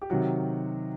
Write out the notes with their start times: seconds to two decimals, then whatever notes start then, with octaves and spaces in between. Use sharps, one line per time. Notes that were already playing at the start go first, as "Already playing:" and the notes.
0.02 G4
0.10 C3 D#3 F#3 F#4